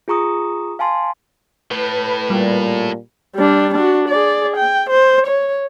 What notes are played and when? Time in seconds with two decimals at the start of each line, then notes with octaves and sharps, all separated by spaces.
0.08 F4 G#4 A#5 C#6 D#6
0.79 F5 G#5 A5 C6
1.71 A2 B4
2.30 A#2 G3
3.36 G3 D4
3.75 D4 F#4
4.09 G#4 D5
4.57 G5
4.90 C5
5.27 C#5